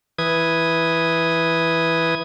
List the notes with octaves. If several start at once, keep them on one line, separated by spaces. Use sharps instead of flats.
E3 B4 D#6 G#6